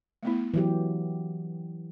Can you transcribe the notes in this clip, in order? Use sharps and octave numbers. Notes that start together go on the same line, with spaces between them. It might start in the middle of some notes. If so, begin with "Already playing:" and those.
A3 B3 E4
E3 F#3 G4